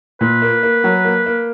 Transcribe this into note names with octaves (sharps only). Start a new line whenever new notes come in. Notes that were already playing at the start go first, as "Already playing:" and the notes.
A#2 B4
A#3
A#3
F#3
A#3
A#3